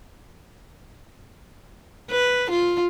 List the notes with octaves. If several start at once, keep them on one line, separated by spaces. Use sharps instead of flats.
B4
F4